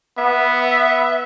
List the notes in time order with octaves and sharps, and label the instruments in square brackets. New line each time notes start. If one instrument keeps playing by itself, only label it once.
[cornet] B3 [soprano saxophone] E5